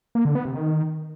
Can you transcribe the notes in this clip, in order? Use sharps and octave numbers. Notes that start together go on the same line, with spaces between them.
A#3
D3
B3
C3
D#3